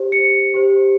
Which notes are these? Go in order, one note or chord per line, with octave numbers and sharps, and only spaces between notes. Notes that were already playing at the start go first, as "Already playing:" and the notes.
Already playing: G4 C5
C#7
G4 C5